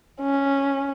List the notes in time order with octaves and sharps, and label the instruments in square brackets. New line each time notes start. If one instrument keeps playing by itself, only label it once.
[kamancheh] C#4